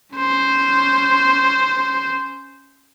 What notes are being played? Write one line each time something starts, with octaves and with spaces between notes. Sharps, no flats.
C#4 C5